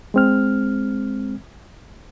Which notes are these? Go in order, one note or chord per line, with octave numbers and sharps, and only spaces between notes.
G#3 C4 F6